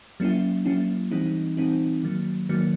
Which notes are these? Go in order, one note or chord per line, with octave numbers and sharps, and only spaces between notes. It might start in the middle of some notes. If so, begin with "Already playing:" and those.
F#3 A#3 C#4 E4
F#3 A#3 C#4 E4
E3 G3 C4 D#4
E3 G3 C4 D#4
D#3 F#3 A#3
D#3 F#3 A#3